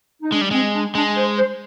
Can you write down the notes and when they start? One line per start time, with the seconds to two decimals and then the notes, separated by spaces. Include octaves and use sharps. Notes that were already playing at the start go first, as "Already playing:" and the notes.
0.22 D#4
0.32 G#3 D4
0.41 G3
0.51 G#3 C4
0.74 D4
0.95 G#3 D4
1.17 C5
1.38 C5